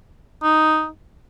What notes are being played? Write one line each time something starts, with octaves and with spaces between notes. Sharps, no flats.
D#4